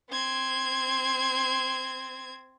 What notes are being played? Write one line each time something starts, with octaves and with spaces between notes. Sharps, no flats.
C4 G#6